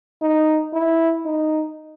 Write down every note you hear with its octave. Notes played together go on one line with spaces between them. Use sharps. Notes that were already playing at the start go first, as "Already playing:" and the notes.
D#4
E4
D#4